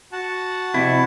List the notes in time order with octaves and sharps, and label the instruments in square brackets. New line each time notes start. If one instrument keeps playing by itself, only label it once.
[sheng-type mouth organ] F#4 F#5 A5
[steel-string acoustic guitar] F2 C3 [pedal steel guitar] E4